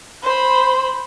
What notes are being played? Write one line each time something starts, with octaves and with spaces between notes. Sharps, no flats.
C5 B5